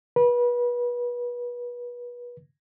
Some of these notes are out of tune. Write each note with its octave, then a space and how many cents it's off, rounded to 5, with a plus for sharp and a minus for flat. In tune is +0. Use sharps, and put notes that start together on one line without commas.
B4 -30